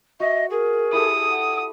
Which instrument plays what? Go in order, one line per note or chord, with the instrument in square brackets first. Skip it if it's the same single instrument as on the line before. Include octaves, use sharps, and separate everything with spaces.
[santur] F#4 [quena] D#5 [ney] E5
[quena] G#4 [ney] A#4
[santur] E4 G4 A4 [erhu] D#6
[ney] F#5